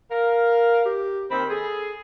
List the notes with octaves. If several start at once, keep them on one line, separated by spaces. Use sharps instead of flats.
A#4 F5
G4
D#2 D#3 C4 B5
G#4 A4